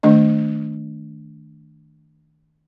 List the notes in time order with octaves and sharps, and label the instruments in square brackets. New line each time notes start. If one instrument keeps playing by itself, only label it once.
[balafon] D#3 A3 D4 D#5